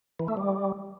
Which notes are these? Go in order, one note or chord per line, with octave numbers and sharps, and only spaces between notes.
E3
A3
G3